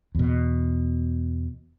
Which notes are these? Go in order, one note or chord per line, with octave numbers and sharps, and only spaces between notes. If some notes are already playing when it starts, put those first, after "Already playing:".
E2 B2